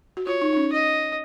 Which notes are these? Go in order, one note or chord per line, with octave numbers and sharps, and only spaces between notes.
F#4
F4 C#5
D#4
D#4
C#4
D#5